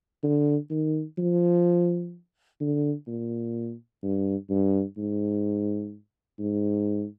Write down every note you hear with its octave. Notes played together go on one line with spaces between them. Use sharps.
D3
D#3
F3
D3
A#2
G2
G2
G#2
G#2